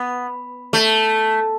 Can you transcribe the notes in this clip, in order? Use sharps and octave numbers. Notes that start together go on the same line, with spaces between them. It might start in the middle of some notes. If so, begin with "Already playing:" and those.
Already playing: B3
A3